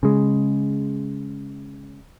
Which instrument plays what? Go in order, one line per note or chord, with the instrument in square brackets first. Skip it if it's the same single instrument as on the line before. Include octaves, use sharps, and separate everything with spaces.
[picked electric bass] C#3 G#3